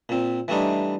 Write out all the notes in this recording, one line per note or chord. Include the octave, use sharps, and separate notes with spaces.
A#2 C4
E3 G3 A3 D4 D#4